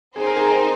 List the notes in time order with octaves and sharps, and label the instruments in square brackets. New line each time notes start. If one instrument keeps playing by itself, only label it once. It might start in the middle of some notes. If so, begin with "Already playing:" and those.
[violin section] C4 D#4 C5 [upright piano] G#4
[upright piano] A#4
G#4
A#4